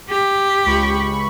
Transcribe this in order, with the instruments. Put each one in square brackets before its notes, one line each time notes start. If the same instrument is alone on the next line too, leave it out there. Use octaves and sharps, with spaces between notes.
[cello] G4
[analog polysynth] C#2 B5 C#6